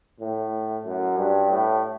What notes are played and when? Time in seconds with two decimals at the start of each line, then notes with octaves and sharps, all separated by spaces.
0.20 A2
0.85 F#2
1.17 G2
1.51 A2